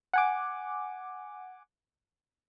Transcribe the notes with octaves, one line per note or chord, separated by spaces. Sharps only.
F#5 G#5 D6